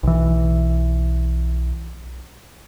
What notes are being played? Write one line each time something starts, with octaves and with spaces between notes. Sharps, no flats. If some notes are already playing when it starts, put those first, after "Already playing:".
B1 E3